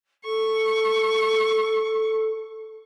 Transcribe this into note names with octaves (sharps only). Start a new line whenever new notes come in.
A4 C#6